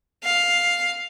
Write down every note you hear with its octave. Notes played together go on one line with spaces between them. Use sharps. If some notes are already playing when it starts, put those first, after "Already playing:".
F5